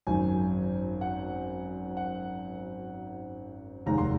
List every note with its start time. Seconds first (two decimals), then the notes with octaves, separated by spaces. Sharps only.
0.07 G#1 F#2 D#3 F#3 G#5
1.01 F#5
1.97 F#5
3.86 F1 D#2 D#3 G#3 A#5
3.98 C6